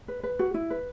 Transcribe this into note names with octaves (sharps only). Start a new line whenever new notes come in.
B4
B4
F#4
E4
B4